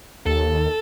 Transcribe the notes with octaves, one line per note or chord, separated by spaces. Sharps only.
D#2 A4